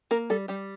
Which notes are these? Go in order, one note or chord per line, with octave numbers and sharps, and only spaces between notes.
A#3 A#4
G3 A4
G3 G4